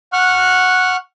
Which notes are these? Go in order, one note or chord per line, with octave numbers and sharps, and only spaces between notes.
F#5 C#6 F6 F#6